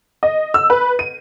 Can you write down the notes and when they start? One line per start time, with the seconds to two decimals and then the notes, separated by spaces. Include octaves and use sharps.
0.23 D#5
0.54 E6
0.70 B4
0.99 D#7